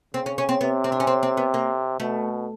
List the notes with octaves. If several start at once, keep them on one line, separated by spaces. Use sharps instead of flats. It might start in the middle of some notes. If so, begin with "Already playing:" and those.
C#3 C4
C#4
C#4
C4
C3 B3
C4
D4
C#4
C4
C4
B3
A#3
B2 A3